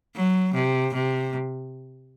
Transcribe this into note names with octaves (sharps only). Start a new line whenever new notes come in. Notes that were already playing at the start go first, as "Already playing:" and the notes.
F#3
C3
C3